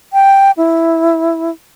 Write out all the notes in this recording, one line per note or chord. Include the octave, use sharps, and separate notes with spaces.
G5
E4